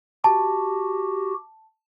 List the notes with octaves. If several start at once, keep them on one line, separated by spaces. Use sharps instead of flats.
F#4 G4 A5